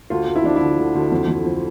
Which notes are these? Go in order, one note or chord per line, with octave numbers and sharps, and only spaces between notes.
D2 F4
D2
E4
F3 D4
E4
D3
D2
D2
F2
F2
F3